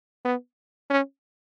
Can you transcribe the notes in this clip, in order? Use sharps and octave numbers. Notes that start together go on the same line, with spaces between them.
B3
C#4